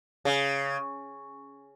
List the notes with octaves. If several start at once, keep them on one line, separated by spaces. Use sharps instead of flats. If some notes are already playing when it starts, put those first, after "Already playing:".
C#3